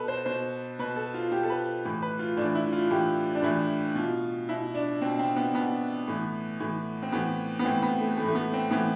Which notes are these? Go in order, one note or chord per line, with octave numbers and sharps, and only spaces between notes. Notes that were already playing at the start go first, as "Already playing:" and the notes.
Already playing: B2 A4 B4
C5
B2 C5
B2 B4
A4
F4
B2 G4
A4
B4
A2 E3
B4
F4
A2 E3 D4
E4
F4
A2 E3 G4
D4
A2 E3 E4
B2 F4
B2 E4
D4
B2 C4
C4
B3
B2 B3
A2 E3
A2 E3
C4
A2 E3 B3
B3
A2 E3 C4
B3
A3
E3 A3
A2
A3
B3
C4
A2 E3 B3